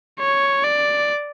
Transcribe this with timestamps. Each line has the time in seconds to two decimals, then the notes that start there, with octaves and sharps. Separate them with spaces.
0.20 C#5
0.64 D5